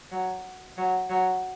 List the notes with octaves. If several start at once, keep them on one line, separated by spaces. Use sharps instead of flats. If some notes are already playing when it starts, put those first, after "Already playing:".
F#3
F#3
F#3